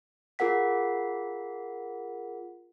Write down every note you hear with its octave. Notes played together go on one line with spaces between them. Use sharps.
F4 G#4 A#4 F#5 B6